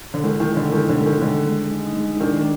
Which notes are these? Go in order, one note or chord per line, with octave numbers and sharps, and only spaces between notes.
D3
D#3 G#3
D#3
G#3
D3
D#3 G#3
D3
G#3
D#3
D3 G#3
G#3
D#4
G#3
D#3 D4